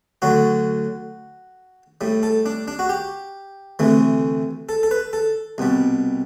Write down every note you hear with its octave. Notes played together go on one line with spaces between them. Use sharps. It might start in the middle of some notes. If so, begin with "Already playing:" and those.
D2 D3 F#3 F#4
A2 G3
A4
D4
D4
F#4
G4
D2 C3 E3 A3
A4
A4
B4
A4
C2 B2 G3